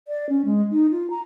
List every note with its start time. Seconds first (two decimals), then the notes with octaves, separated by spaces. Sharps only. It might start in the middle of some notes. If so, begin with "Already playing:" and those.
0.08 D5
0.29 C#4
0.45 G#3
0.72 D#4
0.91 F4
1.10 A#5